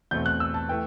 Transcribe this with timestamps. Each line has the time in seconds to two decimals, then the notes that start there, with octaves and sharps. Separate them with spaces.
0.11 E2 B2 A3 C4 G6
0.26 F#6
0.40 E6
0.54 A5
0.69 E3 A3 G5